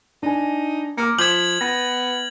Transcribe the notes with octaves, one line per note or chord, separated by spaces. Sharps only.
D4 D#4 G#5
A#3 D6 F6 C#7
F3 G6 G#6 B6 E7 F#7
B3 A#6